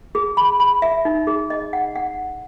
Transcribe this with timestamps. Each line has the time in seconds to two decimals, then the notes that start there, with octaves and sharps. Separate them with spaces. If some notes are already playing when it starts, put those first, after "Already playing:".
0.15 G#4
0.37 B5
0.60 B5
0.82 E5
1.05 D#4
1.27 G#4
1.50 D#5
1.73 F#5
1.95 F#5